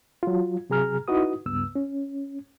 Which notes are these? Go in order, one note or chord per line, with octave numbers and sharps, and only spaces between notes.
F#3 F4
C3 F#3 G#4 A#5 F6
D#4 E4 F#4 B4 D#6
C#2 G2 B3 E6
C#4